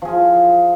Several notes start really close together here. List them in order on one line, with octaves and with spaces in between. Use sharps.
F3 G#4 F4